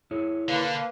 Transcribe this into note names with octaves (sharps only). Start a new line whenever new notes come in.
E4 G#4 C#5
D3 A#3 B4 F5